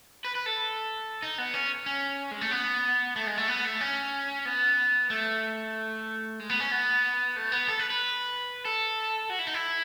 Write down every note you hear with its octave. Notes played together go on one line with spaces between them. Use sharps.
B4
B4
A4
D#4
B3
C#4
C#4
G#3
A3
B3
A3
G#3
A3
B3
A3
C#4
B3
A3
G#3
B3
C#4
B3
A3
B3
A4
B4
B4
A4
F#4
E4
D#4
E4